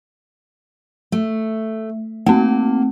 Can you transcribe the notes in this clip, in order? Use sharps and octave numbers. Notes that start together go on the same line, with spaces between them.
A3
A3 A#3 C4